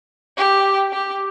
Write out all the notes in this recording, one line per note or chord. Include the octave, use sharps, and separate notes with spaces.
G4
G4